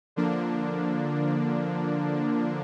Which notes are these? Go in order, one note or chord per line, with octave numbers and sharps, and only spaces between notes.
D3 F3 A#3 D4